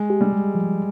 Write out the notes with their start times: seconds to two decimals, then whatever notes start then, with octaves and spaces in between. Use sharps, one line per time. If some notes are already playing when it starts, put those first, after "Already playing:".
Already playing: G#3
0.10 G4
0.21 G3
0.32 G#3
0.55 F3